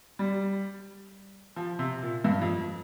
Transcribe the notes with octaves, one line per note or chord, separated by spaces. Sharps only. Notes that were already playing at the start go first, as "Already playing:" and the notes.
G3
F3
C3
A#2
G2
F2